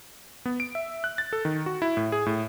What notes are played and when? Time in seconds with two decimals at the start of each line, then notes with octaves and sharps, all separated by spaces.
0.46 B3
0.60 D7
0.75 E5
1.04 F#6
1.18 A6
1.33 A4
1.45 D#3
1.66 F#4
1.82 E4
1.97 A2
2.12 G#4
2.26 A2